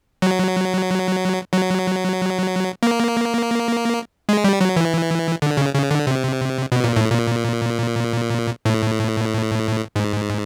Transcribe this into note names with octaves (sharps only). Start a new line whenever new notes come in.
F#3
F#3
A#3
G#3
G3
F#3
E3
D3
C#3
C#3
D3
C3
B2
A#2
A2
A#2
A2
G#2